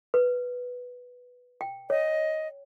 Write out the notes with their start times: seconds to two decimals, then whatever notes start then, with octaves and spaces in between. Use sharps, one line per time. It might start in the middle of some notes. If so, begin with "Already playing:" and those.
0.14 B4
1.61 G5
1.90 C#5 D#5